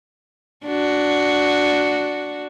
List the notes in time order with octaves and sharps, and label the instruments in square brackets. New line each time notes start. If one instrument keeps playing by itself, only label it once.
[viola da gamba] D4 F#4